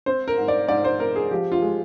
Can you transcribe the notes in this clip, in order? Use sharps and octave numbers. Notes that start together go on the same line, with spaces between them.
C4 C5
A#4
G#2
D5
G#2 D5
C5
C4 A#4
G#4
F3 G4
F4
G#3